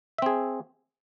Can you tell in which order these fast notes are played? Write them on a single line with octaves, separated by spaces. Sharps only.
E5 C4 G#4